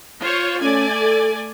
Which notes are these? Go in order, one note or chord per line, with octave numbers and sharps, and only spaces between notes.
F4 C5 C#5
A3 C#4 D5 G#5
A4